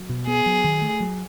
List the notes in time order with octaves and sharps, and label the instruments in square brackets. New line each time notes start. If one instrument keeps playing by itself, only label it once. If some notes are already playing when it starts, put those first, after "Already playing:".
Already playing: [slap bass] F#3
B2
[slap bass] B3 [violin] G#4
[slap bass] F#3
D#3
A3
F#3